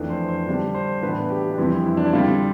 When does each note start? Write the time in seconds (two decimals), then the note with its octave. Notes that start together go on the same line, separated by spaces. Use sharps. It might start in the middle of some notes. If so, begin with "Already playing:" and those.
Already playing: F2 E3 A3 D4
0.10 C5
0.29 C5
0.47 D3 G3 D4
0.74 C5
1.02 A2 E3 B3 D4 B4
1.30 G4
1.51 D4
1.58 F2 E3 G3 C4 E4
1.86 E4
1.97 D4
2.06 E4
2.13 D3 G3 C4 F4